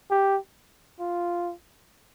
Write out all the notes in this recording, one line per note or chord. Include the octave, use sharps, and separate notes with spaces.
G4
F4